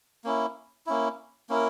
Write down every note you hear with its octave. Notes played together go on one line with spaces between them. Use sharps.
A#3 C#4 E4
A#3 C#4 E4
A#3 C#4 E4 A#4